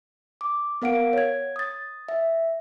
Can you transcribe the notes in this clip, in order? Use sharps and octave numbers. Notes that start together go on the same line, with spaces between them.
D6
B3 A#4 F5 F#5 D7
C#5 G#6
D#6 A6
E5